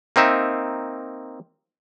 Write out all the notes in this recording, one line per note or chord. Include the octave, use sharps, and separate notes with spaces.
A#3 C4 D#4 E5